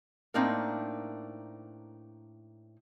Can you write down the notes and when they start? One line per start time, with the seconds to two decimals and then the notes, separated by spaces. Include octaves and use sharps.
0.34 A2 A#3 C4 D4 D#4 A#4